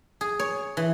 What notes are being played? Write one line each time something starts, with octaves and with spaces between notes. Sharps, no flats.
G#4
C#5
E3